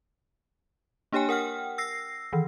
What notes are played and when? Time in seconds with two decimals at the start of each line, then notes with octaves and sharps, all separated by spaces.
1.12 A#3 D4 G4 C#5 G5 G#5
1.29 A#4 F#5 G5 F6
1.78 E6 A#6 C7
2.33 D#3 E3